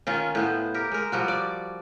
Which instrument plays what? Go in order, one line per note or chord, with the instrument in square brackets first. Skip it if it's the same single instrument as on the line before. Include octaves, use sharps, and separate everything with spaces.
[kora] D#3 C#4 F4
A2 B3 C5
G4 A#4
G#3 A#4
F3 G3 F#4
D5